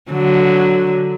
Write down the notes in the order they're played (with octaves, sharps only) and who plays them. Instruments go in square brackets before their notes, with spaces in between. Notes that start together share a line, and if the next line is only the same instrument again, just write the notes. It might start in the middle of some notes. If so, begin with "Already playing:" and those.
[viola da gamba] D3 F#3